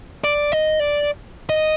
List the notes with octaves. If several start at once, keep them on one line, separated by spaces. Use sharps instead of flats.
D5
D#5
D5
D#5